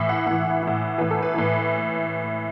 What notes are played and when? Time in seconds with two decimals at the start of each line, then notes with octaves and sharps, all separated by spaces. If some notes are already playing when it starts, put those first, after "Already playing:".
Already playing: A2 E3 E5
0.09 F#5
0.26 A2 E3 F#5
0.63 A2 E3
0.98 A2 E3 B4
1.11 A4
1.22 B4
1.34 A2 E3